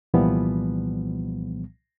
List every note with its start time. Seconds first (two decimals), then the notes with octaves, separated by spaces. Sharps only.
0.14 C2 A#2 E3 F3 G3 B3